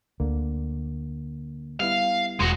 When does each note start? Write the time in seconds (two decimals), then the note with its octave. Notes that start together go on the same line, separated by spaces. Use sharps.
0.20 D2 D3 A#3
1.80 G3 B3 E4 F5
2.40 E1 G#3 F#4